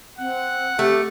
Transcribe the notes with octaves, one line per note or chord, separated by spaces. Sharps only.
C4 F#5
A3 G4